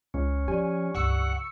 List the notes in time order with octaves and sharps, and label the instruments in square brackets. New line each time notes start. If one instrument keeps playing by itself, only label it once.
[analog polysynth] C#2 [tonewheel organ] C#4
[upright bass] F3 [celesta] G4 D5 [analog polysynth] G#5
[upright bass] C#2 G2 [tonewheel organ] F#5 [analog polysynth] C#6 E6 C#7